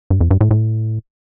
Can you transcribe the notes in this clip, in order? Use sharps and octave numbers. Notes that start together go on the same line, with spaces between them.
G2
F2
G2
A2
A2